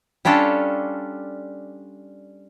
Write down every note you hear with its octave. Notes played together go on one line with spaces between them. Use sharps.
G3 C#4 D4 F4 A4